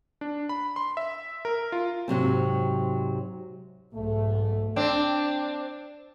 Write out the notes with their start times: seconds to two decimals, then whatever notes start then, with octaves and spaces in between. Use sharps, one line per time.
0.21 D4
0.49 B5
0.76 C6
0.97 E5
1.45 A#4
1.72 F4
2.08 G#2 C3 F#3 C4
3.94 B1 G#2 A3
4.76 C4 D4